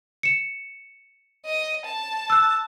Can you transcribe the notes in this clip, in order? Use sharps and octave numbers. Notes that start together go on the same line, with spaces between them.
C#7 E7
D#5
A5
E6 F#6